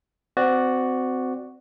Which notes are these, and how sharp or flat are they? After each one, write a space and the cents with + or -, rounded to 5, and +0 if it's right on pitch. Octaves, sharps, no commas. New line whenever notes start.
C4 -25 F#4 +0 D5 +0